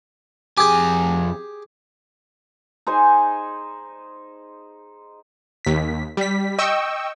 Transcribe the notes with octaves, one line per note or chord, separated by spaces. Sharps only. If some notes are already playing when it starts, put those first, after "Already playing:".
F2 G4 G#4 G#5
D#4 G#4 C5 G#5
D#2 B6
G3 B6
D#5 G5 C#6 E6